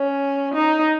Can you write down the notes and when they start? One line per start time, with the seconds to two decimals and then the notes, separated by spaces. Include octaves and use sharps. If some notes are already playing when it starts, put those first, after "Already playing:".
Already playing: C#4
0.54 D#4